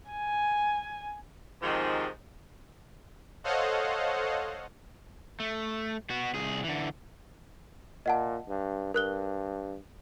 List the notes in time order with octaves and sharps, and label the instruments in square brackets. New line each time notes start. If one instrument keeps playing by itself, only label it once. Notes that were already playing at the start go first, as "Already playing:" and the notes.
[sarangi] G#5
[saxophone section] G#2 C3 D#3 F3 G#3
[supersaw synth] A4 C5 C#5 D#5 F5 F#5
[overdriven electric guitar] A3
B3 F#4
C2 G#4
D3 E3
[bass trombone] A#2 [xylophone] D#5 F#5 A5
[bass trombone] G2
[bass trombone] G2 [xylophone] A#4 F#6 G7